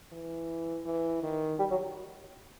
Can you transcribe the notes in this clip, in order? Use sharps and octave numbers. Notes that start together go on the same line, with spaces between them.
E3
E3
D#3
G3
F#3